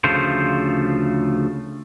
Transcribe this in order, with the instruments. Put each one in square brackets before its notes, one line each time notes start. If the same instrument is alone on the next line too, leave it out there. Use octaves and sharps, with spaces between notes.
[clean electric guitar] D2 C#3 F3 A3 F4 C5